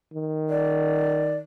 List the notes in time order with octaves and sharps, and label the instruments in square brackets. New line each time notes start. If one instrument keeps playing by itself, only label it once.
[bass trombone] D#3
[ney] D5